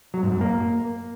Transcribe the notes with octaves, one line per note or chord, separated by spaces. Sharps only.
F#3
G#2
F#2
A#3